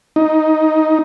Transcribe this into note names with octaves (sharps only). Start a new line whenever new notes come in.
D#4